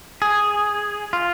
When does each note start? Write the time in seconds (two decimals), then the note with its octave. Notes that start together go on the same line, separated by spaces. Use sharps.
0.22 G#4
1.13 F4